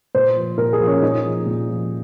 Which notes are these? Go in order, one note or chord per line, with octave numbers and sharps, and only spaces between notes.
A#2 C5
F3
A#2 A#4
G#4
F3
C#4
A#2 D#4
F3
A#2
F3